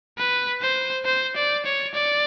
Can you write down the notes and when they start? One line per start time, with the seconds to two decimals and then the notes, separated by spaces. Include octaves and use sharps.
0.18 B4
0.62 C5
1.05 C5
1.36 D5
1.66 C#5
1.94 D5